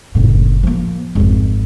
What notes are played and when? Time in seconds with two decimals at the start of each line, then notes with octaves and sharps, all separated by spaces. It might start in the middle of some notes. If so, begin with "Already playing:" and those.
0.15 F#1 A2
0.63 F3 A#3
1.15 G#1 F2